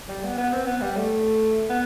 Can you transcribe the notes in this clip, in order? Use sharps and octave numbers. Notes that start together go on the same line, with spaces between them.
G3
B3
B3
C4
B3
G3
A3
B3